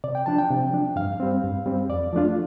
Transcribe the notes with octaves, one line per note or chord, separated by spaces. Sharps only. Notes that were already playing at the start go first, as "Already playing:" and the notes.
C3 D5
G5
F3 D4 A5
G5
C3
F3 D4
G2 F5
G3 C4
G2
G3 C4
F2 D5
F3 A3 D4 F4